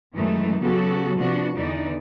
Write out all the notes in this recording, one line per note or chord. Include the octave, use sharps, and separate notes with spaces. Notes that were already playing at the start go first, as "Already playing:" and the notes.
F#2 D#3 E3 G#3 A3 D#4
C#3 F#3 B3 F#4 G4 A4
C3 F3 B3 D4 F#4
E2 D3 E3 D#4 D5